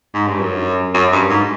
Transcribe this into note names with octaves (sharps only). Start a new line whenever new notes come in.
G#2
G2
F#2
F#2
G2
G#2